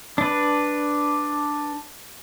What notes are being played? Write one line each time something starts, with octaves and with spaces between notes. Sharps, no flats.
D4 B4